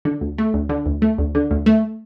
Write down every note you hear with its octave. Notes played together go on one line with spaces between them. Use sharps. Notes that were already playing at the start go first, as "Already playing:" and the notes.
D3
D2
A3
D2
D3
D2
A3
D2
D3
D2
A3